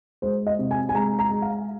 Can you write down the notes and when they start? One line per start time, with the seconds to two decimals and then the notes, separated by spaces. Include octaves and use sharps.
0.22 G#3 C5
0.47 D#5
0.59 C3
0.71 G#5
0.89 G#5
0.95 G#3 A#5
1.19 A#5
1.30 G#3
1.42 F5